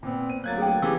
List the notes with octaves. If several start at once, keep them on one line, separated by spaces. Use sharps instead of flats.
A#2 B3 C4
D#7
D2 F#3 A#3 F#6 G#6 A6
G#4 A4 G5
E3 F3 C#4 G4 G#4 E6